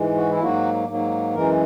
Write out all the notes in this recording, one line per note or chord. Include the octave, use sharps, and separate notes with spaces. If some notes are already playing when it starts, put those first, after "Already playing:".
Already playing: G#2 E3 G#3
F#4
E4
G#2 F#3 A#3 F#4
G#2 F#3 A#3
F#2 E3 G#3 A#4